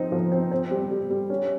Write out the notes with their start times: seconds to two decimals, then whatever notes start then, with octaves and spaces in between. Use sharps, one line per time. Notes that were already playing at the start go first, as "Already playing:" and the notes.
Already playing: F3 C4 D#4
0.12 F3
0.32 C4
0.52 C4
0.71 G3
0.91 G3
1.10 G3
1.30 C#4